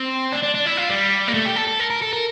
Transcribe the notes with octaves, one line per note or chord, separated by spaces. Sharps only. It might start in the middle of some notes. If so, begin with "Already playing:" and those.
Already playing: C4
D4
D4
D4
E4
F4
G3
A#3
A3
G4
A4
A4
A#4
A#4
A4
A#4